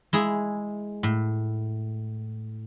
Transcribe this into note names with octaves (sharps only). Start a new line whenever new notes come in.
G#3 E4 G#4
A2